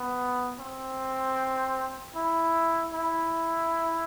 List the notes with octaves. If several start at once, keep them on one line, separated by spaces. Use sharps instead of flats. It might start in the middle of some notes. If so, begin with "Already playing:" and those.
Already playing: B3
C4
E4
E4